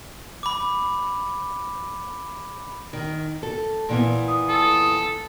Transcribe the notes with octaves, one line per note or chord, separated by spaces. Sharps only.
B5 D6
D#3
A4
A#2 E3 B3
D#6
A4